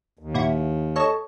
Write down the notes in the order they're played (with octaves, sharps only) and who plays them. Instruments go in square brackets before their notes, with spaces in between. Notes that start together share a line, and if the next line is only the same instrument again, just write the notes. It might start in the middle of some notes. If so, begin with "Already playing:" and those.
[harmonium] D#2
[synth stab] A#2 E4 F#4
A4 C#5 D#5